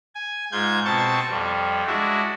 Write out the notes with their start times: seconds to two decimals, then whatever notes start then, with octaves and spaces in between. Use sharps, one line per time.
0.15 G#5
0.52 G#2 F4 G6 G#6
0.85 B2 C4 A5 C#6 A6
1.30 F2 G3
1.87 G#3 D4 E4 F#4